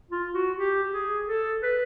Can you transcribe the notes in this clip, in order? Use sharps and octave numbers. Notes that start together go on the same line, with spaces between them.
F4
F#4
G4
G#4
A4
B4